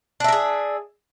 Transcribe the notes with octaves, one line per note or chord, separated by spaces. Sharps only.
D4 G#4 A#4 E5